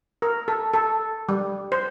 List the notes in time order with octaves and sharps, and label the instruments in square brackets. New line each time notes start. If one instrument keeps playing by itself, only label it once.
[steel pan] A#4
A4
A4
G3
C5